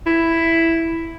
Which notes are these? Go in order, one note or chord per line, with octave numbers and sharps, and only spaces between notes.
E4